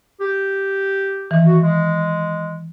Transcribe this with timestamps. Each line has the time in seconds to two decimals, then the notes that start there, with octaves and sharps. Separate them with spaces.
0.21 G4
1.31 D#3 E3
1.46 F#4
1.62 G#3